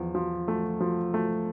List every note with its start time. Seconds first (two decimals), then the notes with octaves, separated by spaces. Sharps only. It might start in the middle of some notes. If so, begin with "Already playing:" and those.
Already playing: E2 F3
0.15 F3
0.48 A3
0.81 F3
1.14 A3